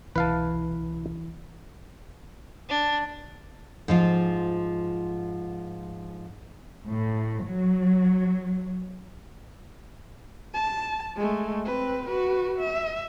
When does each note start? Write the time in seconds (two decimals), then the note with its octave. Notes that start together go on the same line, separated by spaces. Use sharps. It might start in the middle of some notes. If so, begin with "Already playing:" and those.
0.16 C2 B2 E3 B4 F5 A5
2.69 D4
3.88 G#2 F3 F4
6.88 A2
7.45 F#3
10.54 A5
11.16 G#3 A3
11.65 C4 B4
12.07 F#4 B4
12.58 E5